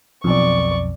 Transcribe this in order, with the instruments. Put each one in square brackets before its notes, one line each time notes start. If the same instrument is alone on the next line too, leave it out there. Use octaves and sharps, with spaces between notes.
[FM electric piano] B1 F2 [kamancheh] D5 C#6